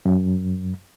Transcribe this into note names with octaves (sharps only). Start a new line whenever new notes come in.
F#2